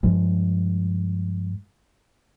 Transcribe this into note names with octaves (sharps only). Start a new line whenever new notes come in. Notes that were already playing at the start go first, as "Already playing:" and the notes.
G2 F3 G#3